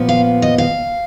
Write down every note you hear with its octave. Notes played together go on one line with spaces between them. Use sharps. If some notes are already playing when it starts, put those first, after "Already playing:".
Already playing: A#2 F3 B3
F5
D#5
F5